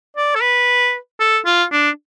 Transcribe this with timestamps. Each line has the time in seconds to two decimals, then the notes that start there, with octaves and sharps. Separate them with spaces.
0.17 D5
0.35 A4
0.42 B4
1.20 A4
1.46 F4
1.72 D4